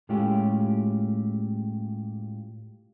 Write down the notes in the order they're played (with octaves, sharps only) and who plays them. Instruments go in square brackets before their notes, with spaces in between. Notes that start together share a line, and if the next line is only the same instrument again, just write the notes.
[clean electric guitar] A2 G#3 A3 C#4 F4 G4